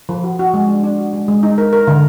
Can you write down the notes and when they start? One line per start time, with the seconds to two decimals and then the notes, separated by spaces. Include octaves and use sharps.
0.09 F3
0.24 F#4
0.39 F#4
0.54 G#3
0.68 D4
0.83 D4
0.98 F#4
1.13 G#3
1.28 G#3
1.43 D#4
1.58 A#4
1.73 A#4
1.87 D3